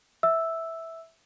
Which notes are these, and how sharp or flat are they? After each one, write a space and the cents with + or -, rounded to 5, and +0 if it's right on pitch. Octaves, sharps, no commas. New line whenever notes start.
E5 -10 E6 +0